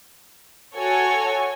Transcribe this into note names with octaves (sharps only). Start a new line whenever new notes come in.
F#4 A4 C#5 G#5